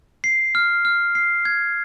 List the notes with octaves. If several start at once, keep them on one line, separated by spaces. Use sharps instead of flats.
C7
F6
F6
C7
G#6